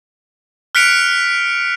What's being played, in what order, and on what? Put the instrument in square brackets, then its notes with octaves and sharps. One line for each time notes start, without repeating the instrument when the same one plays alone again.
[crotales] F6 F#6 B6 C#7 D7 F7